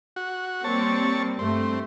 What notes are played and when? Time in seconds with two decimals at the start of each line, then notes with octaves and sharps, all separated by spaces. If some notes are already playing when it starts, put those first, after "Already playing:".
0.16 F#4
0.64 G3 A#3 C4 C#5 A5
1.39 G2 A3 C4